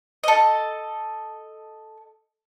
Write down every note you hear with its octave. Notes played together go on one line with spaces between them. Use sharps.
A4 D#5